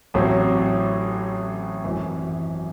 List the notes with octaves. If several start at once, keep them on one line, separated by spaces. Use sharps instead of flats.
A1 A2 F#3 C4
G#1 F#2 E3